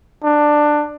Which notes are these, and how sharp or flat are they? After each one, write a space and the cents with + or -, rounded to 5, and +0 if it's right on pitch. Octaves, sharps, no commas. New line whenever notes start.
D4 +15